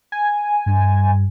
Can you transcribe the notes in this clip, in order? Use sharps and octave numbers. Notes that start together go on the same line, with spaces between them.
G#5
G2